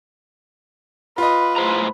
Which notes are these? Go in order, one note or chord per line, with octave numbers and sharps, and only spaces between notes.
F4 B4 D#5
A2 C5 A#5